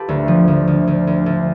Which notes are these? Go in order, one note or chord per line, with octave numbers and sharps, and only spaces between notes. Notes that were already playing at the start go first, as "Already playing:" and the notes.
Already playing: F4 G4 A4 B4
D2
F3
D2
D2
D2
D2
D2